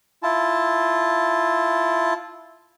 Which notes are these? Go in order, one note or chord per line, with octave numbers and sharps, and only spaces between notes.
E4 F4 A5